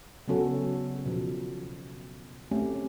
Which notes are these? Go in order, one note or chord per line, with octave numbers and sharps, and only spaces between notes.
C#3 F#3 B3 C#4 F#4 A4
B2 F3
A3 C4 C#4 G4